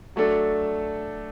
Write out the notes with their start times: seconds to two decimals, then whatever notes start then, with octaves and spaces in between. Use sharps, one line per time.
0.16 F#3 A3 D4 A4